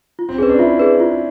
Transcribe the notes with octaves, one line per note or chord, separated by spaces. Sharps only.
F4
C4
C#4 G#4 B4
D4
E4 F4
G#4 B4
F4